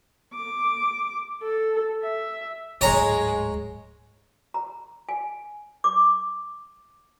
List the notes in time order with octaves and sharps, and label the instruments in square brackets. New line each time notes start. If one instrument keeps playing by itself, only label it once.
[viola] D6
A4
E5
[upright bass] D1 G#2 [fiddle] G#3 [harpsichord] C#5 A#5
[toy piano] A#5
G#5
D6